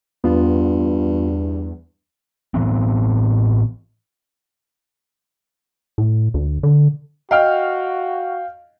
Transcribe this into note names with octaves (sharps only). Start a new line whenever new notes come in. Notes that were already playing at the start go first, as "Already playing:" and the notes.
E2 G2 B3 F4
A2 E3 B3 C4
A2
D2
D3
F#4 D#5 F5 G5 F6